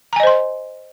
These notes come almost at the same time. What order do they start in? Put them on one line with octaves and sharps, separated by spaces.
A#5 G#5 D#5 C5 C6